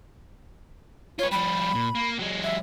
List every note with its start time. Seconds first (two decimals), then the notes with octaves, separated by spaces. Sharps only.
1.19 F4 B4 C#5
1.32 F3 G3 B5
1.75 A#2
1.95 A#3
2.19 F#3 G#3
2.44 E5